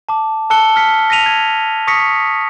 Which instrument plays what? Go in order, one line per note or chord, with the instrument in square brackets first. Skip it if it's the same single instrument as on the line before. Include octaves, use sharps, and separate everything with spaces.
[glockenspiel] A5 D6
A5 E6 F#6 C#7 G7
F6 B6 C#7
A#6 B6 D#7 F7
G#6
C#6 D#6 A#6 B6 C#7